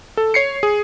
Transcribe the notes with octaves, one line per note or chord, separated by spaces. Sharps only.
A4
C#5 C7 C#7
G#4